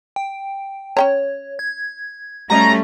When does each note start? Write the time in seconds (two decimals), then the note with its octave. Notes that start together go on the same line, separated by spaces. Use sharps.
0.16 G5
0.97 C#4 C#5 G5 A#5
1.59 G#6
2.50 G3 A3 C#4 F#4 D#5 A#5